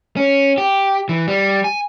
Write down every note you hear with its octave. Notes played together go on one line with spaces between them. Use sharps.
C#4
G4
E3
G3
G#5